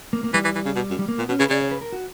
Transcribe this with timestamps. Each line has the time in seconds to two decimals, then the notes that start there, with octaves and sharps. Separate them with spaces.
0.13 A#3
0.24 A#3
0.34 E3 G3
0.44 E3
0.55 E3
0.66 C#3
0.76 B2
0.91 F#2
0.99 G3
1.08 A#3
1.18 A#2 B3
1.29 B2 C#4
1.39 C#3 B4
1.50 C#3 D5
1.61 C#5
1.71 B4
1.81 A#4
1.93 F#4